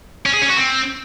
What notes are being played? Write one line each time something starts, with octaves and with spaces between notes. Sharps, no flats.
C#4
G#4
C#4
F#4
C4